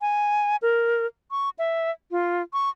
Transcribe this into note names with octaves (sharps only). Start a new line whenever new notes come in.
G#5
A#4
C#6
E5
F4
C#6